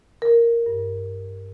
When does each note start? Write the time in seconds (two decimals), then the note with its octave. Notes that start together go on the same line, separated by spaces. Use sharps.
0.22 A#4
0.66 G2